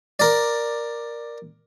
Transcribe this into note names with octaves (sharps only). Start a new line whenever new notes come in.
A#4 D5